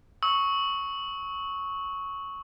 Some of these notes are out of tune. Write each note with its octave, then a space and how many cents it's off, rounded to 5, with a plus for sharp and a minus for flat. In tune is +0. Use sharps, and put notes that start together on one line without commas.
C#6 +0 E6 -35